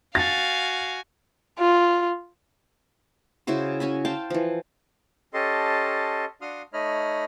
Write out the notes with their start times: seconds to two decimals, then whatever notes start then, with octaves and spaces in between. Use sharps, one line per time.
0.15 F#4 F5 G#5 A6
1.59 F4
3.47 C#3 E4 F#4 C5
3.80 C#4 F#4 G#5 B5
4.05 C5 F5 G5 A5
4.30 E3 F3
5.34 C#4 G4 A4 D#5 A5 C6
6.41 D4 F#4 F5 C6 D#6 F6
6.73 A3 D#4 C#5 D#5 B5 F6